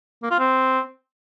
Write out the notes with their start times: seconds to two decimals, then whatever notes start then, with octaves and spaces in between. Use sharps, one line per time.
0.23 A#3
0.31 F4
0.39 C4